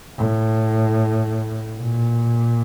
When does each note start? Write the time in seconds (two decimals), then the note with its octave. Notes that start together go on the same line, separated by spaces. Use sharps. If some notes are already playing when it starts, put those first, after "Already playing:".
0.18 A2
1.79 A#2